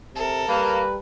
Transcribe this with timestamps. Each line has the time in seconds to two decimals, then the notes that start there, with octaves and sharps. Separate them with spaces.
0.15 C3 A4 A#4
0.49 G3 A#3 B4